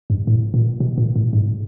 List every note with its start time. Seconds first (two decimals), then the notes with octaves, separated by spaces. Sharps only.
0.10 G2
0.27 A2
0.54 A#2
0.80 B2
0.98 A#2
1.16 A2
1.33 G#2